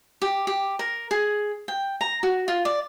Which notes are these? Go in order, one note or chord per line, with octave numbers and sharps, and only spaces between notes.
G4
G4
A#4
G#4
G5
A#5
F#4
F4
D5